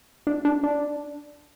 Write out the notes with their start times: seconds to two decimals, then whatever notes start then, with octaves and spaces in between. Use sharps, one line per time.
0.27 D4
0.45 D4
0.63 D4